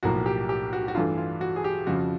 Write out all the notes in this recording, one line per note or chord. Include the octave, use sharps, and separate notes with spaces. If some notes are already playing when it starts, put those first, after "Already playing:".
B1 A2 F3 A#3 F#4
G4
G4
F#4
F#4
G2 E3 A3 F4
F4
F#4
G#4
G4
F2 C#3 F3 F#4